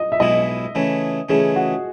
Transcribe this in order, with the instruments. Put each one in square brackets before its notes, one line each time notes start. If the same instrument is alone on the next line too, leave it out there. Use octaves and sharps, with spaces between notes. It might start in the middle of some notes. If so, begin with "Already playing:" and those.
Already playing: [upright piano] D#5
E5
[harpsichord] B1 B2 G#3 B3 E4 [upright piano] D#5
[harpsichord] C#3 E3 A3 C#4
[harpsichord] C#3 E3 A3 C#4 [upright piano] G#4
[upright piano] F#4